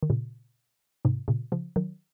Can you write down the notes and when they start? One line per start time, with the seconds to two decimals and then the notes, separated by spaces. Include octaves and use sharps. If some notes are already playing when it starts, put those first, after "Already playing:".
0.03 D#3
0.10 A#2 C#3
1.05 G#2 C3
1.28 A#2 C#3
1.52 C#3 F3
1.76 D#3 F#3